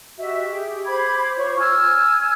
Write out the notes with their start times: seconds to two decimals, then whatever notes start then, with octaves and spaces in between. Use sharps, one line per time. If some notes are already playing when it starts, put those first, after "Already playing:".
0.19 F#4 G4 D#5 E5
0.48 G4 G#4
0.85 C5 B5 D6 G#6
1.38 F4 C5 C#5 C#6
1.58 G#5 E6 F6 G#6